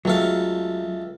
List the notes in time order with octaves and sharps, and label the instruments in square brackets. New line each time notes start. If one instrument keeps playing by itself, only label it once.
[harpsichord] C#2 A3 F5 [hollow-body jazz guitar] F#3